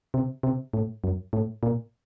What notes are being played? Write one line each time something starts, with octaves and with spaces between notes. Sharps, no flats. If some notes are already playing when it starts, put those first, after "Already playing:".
C3
C3
A2
F#2
A2
A#2